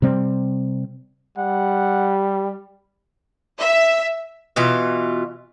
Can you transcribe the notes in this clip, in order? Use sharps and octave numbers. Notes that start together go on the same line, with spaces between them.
C3 G3 C4
G3 F#5
E5
B2 E3 F4